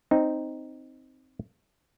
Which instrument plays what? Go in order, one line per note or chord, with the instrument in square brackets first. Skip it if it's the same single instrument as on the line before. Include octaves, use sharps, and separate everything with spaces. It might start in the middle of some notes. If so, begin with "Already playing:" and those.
[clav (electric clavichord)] C4 D#4